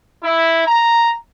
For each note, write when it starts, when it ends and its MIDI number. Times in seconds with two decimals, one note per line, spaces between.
0.22 0.62 64
0.66 1.13 82